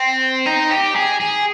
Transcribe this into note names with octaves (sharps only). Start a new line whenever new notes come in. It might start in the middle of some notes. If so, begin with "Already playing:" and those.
Already playing: C4
D#4
G4
G#4
G#4